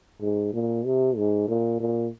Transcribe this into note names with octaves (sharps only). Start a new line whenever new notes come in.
G#2
A#2
C3
G#2
A#2
A#2